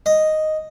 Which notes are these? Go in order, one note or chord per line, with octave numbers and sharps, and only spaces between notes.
D#5